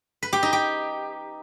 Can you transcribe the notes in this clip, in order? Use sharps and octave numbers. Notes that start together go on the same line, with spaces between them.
B4
G4
D#4
G4